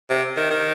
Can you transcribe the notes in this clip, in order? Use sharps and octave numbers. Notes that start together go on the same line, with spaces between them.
C3
D#3
D#3